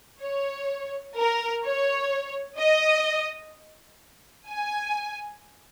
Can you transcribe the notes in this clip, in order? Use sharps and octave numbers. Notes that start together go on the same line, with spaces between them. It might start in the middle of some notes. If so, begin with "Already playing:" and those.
C#5
A#4
C#5
D#5
G#5